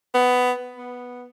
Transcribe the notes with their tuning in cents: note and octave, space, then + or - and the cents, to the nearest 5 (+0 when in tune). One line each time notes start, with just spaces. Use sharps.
B3 +15
B3 -5